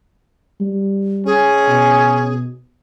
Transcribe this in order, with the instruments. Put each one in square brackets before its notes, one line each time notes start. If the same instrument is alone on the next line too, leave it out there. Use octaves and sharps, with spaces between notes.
[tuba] G3
[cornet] C#4 [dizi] G#4
[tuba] B2